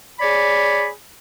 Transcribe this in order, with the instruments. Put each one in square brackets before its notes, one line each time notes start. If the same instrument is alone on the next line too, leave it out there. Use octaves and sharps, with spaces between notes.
[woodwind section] G#4 C#5 D5 B5